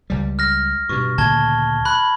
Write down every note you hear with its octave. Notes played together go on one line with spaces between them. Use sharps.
C#2 G3
F6 A#6
G2 B2 C#6
D2 A#2 C#3 A5 G#6 G7
B5 F#6